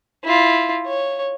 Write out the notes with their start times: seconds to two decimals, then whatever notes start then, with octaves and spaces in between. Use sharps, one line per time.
0.24 E4 F4
0.87 C#5